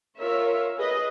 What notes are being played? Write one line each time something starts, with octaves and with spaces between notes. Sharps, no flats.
F4 A#4 C#5 E5
G#4 B4 D#5